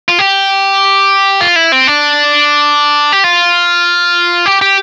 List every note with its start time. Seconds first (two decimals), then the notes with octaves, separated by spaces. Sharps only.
0.09 F4
0.19 G4
1.41 F4
1.56 E4
1.72 C4
1.87 D4
3.12 G4
3.24 F4
4.46 G4
4.62 G4